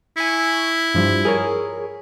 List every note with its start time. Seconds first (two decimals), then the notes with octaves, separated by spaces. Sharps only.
0.17 E4 G#5 C#6
0.94 G2 F3 G3
1.25 G#4 A#4 C#5